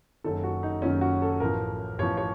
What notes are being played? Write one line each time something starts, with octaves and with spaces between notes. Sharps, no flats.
F#1 F#2 D#3 A4
F#4
D#4
F#1 F#2 D#3 C#4
F#4
A4
A1 A2 F3 A#4
A1 A2 F3 C#5
C#5